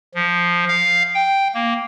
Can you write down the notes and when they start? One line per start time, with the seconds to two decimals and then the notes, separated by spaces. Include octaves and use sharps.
0.14 F3
0.68 F5
1.14 G5
1.54 A#3